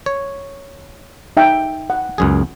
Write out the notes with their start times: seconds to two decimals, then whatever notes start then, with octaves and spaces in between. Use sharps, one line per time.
0.06 C#5
1.37 D#4 E5 G5
1.90 F#5
2.18 C#2 F#2 G#4